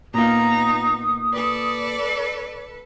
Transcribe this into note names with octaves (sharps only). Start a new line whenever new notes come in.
A#2 B3 D#4 F4 A#5 D#6
A4 B4 D5